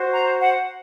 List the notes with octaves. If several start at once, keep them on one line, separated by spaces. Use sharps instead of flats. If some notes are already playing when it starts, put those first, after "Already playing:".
Already playing: F#4 C5
A#5
F#5